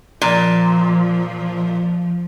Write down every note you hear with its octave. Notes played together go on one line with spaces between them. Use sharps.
A#2 F3